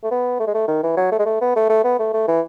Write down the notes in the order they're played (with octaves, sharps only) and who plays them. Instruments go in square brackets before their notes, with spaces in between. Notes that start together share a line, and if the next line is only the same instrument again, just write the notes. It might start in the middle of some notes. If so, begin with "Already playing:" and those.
[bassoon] A3
B3
A3
G#3
A3
D#3
E3
F#3
A3
G#3
A3
B3
A3
A3
B3
A3
A3
E3